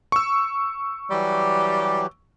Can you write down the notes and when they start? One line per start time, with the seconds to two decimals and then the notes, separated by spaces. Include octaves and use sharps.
0.12 C#6 E6
1.11 E3 F#3 G3 G4